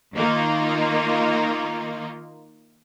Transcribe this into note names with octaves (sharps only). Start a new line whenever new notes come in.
D#3 A#3 D#4 F4